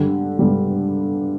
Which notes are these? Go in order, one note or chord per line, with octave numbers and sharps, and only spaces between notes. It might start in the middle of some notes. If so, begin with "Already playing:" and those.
Already playing: G2 D3 G3
G2 D3 G3